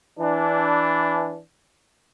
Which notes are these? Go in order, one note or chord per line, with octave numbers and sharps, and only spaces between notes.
E3 D4